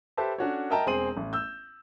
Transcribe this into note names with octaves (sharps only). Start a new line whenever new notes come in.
G4 A4 B4 C5 E5 A5
C#4 D4 F#4 A4 C#5
A#4 D#5 E5 G5 A5 A#5
E1 C4 G#4 C6 D#7 F#7
A1
E6 G6